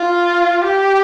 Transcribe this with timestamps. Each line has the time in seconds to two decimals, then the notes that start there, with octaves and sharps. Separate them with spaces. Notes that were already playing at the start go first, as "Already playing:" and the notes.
Already playing: F4
0.64 G4